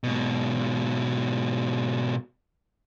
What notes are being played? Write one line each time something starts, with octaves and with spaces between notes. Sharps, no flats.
G#2 B2